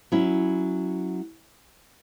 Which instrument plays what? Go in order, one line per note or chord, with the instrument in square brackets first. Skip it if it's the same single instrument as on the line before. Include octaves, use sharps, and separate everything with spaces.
[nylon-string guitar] F#3 C#4 E4